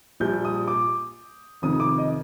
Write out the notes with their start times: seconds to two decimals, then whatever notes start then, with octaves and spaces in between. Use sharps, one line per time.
0.20 A#1 A#2 G3 G6
0.45 D#6
0.67 D6
1.62 F1 F2 D#3 D#6
1.80 D6
1.98 D#5